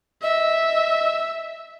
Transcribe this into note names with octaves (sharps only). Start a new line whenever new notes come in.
D#5 E5